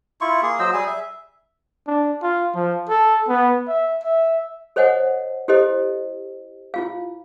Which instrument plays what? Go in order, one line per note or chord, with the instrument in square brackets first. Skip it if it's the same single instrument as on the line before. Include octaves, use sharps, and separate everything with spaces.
[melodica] E4 F4 C#6
A#3 G#4
F#3 C5 D#5 E6
G3 G#4 G#5
E5
[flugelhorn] D4
F4
F3
A4
B3
E5
E5
[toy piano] A4 C5 C#5 D#5 F#5 G#5
E4 G4 A4 C5 D#5
E4 F4 F5